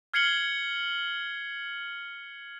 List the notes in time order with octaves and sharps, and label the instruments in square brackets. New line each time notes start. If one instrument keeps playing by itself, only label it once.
[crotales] F6 G#6 C7 C#7 F#7 G7